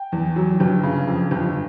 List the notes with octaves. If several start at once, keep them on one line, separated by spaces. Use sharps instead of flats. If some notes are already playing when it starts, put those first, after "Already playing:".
Already playing: G5
E2
F#3
G1
C#3
F2
G1